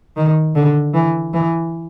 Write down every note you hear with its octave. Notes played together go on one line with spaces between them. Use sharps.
D#3
D3
E3
E3